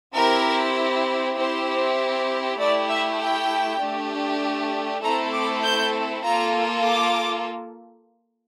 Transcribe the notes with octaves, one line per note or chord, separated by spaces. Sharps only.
C4 E4 G4 A#4
C4 E4 G4 C5
A3 E4 G4 D5
E5
G5
A3 D4 G4
A3 C4 E4 A4 A#5
D6
G6
A#3 F4 A4 A#5
D6